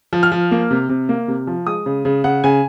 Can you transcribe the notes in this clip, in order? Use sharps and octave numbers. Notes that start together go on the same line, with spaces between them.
F3
F6
F3
A#3
C3
C3
A#3
C3
F3
G#3 D#6
C#3
C#3
C#3 F#5
C#3 G#5